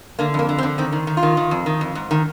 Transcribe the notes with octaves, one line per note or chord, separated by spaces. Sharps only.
D3 A#3
F2 A#3
D3
C4
D3
D#3 C4
D#3
D#3
F4
D#3
D#3
F2
D#3
F2
G#2
D#3